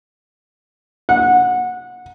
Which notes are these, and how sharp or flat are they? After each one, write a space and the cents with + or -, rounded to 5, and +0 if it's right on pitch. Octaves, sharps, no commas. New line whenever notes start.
F#5 -20